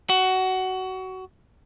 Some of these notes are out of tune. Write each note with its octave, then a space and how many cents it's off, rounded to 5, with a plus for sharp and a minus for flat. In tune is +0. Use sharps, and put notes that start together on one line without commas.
F#4 +20